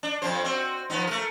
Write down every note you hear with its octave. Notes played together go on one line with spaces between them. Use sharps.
D4
F2 F3 C5
C4 F#4
F3 B3 D#4
A3 A#4